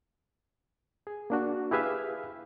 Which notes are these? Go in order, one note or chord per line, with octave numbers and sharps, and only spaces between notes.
G#4
A#3 D4 F#4
E4 G4 G#4 B4 E5 F5